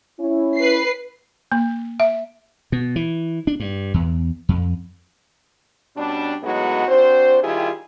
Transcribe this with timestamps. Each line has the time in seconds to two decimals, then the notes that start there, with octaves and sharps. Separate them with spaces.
0.19 C#4 E4
0.57 B4 C7
1.52 A#3
2.00 E5
2.72 B2
2.96 E3
3.47 D4
3.60 G2
3.94 E2
4.49 F2
5.96 B2 G3 C#4 D4
6.43 A2 F#3 G#3 B3 D#4 F#4
6.87 C4 D4 F#4 C5
7.43 D#3 G3 E4 F4 G4 G#4